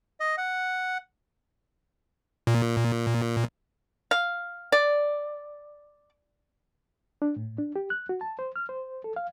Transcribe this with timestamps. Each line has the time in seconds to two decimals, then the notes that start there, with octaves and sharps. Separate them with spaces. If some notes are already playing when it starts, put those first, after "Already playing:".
0.20 D#5
0.38 F#5
2.47 A#2
4.11 F5
4.72 D5
7.22 D4
7.36 A2
7.58 D4
7.76 G4
7.90 F#6
8.09 F#4
8.21 A5
8.39 C5
8.56 F6
8.69 C5
9.04 A4
9.16 F5